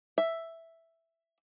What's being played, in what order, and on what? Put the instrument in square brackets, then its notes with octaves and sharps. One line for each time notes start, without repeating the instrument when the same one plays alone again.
[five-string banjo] E5